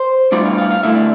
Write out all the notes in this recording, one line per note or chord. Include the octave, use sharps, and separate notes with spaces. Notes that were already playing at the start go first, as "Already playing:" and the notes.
Already playing: C5
A2 G3 B3 D4 F4 D5
F5
F5
F5
D2 D3 A3 E4 E5
D5